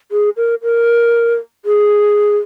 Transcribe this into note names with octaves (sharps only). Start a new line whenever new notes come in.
G#4
A#4
A#4
G#4